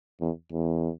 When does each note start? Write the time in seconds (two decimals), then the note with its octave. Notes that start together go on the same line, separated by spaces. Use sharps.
0.21 E2
0.52 E2